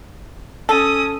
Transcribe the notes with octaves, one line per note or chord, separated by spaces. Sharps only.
C#4 A4 D#6